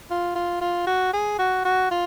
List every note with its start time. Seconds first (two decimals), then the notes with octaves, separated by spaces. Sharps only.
0.11 F4
0.36 F4
0.61 F4
0.87 F#4
1.13 G#4
1.39 F#4
1.65 F#4
1.91 F4